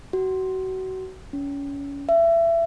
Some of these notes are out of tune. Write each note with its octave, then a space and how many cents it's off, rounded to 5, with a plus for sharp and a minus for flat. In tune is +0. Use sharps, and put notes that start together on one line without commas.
F#4 +30
C#4 +25
E5 +25